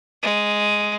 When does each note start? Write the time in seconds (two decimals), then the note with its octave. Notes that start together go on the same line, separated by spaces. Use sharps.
0.23 G#3